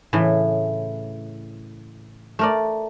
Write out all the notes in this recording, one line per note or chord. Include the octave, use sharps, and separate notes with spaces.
A2 C#3 E3
A3 A#4 D5